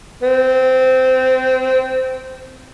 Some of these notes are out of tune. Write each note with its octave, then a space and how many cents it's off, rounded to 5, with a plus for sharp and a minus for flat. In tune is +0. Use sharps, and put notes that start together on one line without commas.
C4 -15